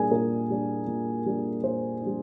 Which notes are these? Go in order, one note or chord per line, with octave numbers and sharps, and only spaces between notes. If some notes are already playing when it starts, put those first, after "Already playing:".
Already playing: A#2 G3 D4 G#4 A#4 G#5
A#2 A#4
G3 D4
A#2
G3 D4
A#2 C5
G3 D4